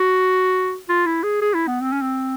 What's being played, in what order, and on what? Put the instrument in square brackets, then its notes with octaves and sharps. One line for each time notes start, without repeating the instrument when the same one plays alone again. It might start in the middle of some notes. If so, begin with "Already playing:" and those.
Already playing: [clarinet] F#4
F4
E4
G#4
G#4
E4
B3
C4
C#4
C4